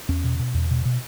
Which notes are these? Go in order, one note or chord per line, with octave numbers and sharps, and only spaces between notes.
E2 C#4
B2
B2
E2
B2
B2